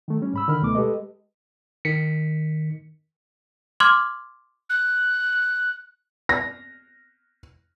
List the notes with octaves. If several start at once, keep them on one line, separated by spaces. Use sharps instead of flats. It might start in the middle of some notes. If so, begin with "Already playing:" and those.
D#3 A3
G3 C#4
G#2 B5 E6
D3 D#3 D#4 A#4 B5 F6
D2 B2 A3 B3 D6
G#3 G4 A4 B4 D#5
D#3 B6 C#7
C6 D6 F6 G#6
F#6
A#6